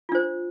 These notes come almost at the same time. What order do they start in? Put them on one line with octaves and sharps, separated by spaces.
F4 D4 C5